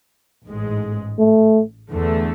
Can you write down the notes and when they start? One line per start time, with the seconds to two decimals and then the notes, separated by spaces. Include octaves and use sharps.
0.47 A1 G#2 G#3
1.19 A3
1.91 E2 D3 A3